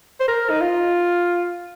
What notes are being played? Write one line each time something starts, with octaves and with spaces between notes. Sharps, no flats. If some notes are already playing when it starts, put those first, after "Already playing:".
C5
A#4
D#4
F4